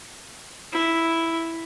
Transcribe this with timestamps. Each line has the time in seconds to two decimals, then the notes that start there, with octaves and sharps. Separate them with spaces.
0.72 E4